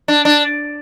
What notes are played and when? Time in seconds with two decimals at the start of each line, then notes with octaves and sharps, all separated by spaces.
0.08 D4
0.25 D4